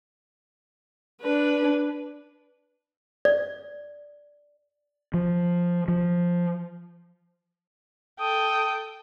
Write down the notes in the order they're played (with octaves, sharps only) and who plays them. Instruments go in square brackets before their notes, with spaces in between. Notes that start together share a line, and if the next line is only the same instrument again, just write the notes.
[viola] D4 B4
[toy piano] D5
[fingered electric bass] F3
F3
[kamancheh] A4 G5 [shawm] D#6